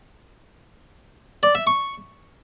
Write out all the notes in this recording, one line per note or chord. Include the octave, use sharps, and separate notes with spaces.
D5
E5
C#6